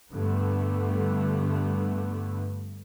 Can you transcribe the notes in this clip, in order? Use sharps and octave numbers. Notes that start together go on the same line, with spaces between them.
G2 D3 A3 B3